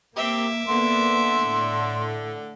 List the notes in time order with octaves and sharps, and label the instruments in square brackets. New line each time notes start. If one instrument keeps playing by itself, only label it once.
[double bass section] A#3 [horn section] C4 G4 [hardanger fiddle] E5 D6
[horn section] D3 [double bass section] A#3 B3 [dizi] C6
[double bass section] A2